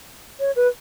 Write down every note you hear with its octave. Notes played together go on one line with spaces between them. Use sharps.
C#5
B4